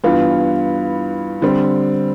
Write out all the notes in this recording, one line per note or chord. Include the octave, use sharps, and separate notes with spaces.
G2 E3 B3 F4
D3 G3 C4